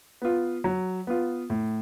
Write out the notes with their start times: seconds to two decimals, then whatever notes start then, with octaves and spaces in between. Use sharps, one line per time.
0.22 B3 F4
0.64 F#3
1.07 B3 F4
1.50 A2